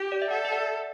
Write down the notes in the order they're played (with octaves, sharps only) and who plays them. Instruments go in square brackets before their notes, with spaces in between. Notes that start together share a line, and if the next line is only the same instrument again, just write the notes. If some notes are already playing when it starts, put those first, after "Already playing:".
Already playing: [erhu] G4
[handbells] D5
E5
[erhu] A4 [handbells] D5 F#5
[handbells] E5
D5 F#5